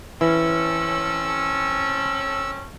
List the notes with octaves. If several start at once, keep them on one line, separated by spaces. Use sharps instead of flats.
E3 C4 C#4 A4 E6